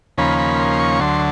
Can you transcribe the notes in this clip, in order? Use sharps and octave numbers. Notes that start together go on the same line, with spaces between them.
D#2 C#3 F3 A#3 C#4 B5
B5
C6
C#6
D2 D3 F#3 C6